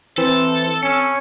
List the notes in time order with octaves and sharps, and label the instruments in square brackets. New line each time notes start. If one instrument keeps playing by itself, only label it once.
[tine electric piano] E3 [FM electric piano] C4 [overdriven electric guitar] A4 [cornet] C5
[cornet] C#4 [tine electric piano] C#7